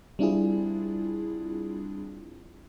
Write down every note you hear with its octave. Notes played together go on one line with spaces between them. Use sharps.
G3 C4 D4 E4 F4 G#4